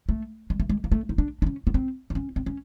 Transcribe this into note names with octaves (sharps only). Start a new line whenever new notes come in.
A3
G#3
A3
G#3
A#3
A3
D#4
D4
D4
C#4
B3
C4
D4
C#4
C4
C#4